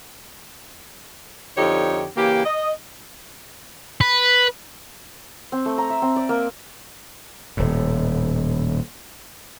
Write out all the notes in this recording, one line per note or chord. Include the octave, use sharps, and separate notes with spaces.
F2 D3 D#4 G4 C#5
C#3 E3 A#3 G4
D#5
B4
C4
A3
A#5
E5
C4
D5
A#3
D#1 A2